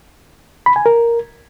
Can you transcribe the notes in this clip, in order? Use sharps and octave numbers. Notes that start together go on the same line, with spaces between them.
B5
G#5
A#4